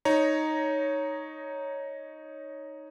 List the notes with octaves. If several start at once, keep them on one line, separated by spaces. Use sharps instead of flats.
D#4 C#5 A#5